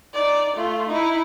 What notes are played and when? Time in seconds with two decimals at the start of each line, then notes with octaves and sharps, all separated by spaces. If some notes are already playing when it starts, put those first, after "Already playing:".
0.14 D#4 D5
0.56 A3 F4
0.88 D#4 E4